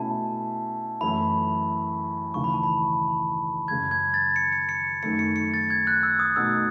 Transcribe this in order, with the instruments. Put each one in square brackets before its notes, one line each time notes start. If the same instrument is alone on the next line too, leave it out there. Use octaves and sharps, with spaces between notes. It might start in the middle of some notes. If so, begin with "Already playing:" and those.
Already playing: [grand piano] B2 A3 C#4 E4 [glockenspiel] A5
[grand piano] F#2 E3 A3 E4 [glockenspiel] B5
[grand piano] D#2 C#3 E3 A3 E4 [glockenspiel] C#6
[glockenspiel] B5
A5
B5
[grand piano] F#2 C#3 G#3 [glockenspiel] G#6
[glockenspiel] G#6
A6
C#7
C#7
C#7
[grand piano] F#2 D#3 A3 [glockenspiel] C#7
[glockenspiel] C#7
C#7
A6
G#6
F#6
E6
D#6
[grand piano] B2 A3 D#4 [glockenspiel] E6